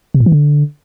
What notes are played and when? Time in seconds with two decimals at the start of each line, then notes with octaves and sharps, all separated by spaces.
0.14 C3
0.20 A2
0.26 E3
0.32 D3